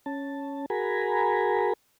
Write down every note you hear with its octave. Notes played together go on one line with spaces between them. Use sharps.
C#4 A5
F#4 G#4 A#4 G#5 A#5 B5